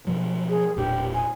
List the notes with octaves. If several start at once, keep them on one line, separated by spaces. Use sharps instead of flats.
B2 F3 F#3
G#4
E1 A#2 D4 G4
G#5